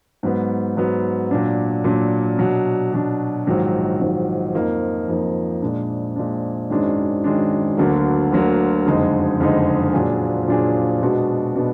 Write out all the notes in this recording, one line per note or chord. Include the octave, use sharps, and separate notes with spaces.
G#2 F#3 B3
G#2 F#3 B3
A#2 F#3 D4
A#2 F#3 D4
B2 F#3 D4
B2 F#3 D4
A#1 G#2 D#3 F#3
A#1 G#2 D#3 F#3
F2 F3 A#3 D#4
F2 F3 A#3 D#4
A#2 G#3 D4
A#2 G#3 D4
G#1 F#2 D#3 G#3 D4
G#1 F#2 D#3 G#3 D4
D2 D3 F#3 A#3
D2 D3 F#3 A#3
F#1 F2 D3 G#3 D#4
F#1 F2 D3 G#3 D#4
A#2 F#3 D4 F4 G#4
A#2 F#3 D4 F4 G#4
B2 G#3 B3 D4 F#4
B2 G#3 B3 D4 F#4